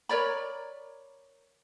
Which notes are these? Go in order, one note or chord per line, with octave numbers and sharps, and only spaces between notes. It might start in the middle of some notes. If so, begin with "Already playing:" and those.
A#4 C#5 D5 B5